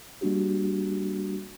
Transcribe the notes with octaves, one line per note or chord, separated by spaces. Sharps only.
G3 A#3 D4 F#4 G4